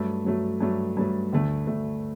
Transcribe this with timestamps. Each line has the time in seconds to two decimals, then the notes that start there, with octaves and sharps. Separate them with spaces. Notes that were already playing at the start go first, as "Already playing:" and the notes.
Already playing: G2 F#3 A3
0.25 G2 F#3 A3
0.60 G2 F#3 A3
0.97 G2 F#3 A3
1.32 D2 D3 A3
1.67 D2 D3 A3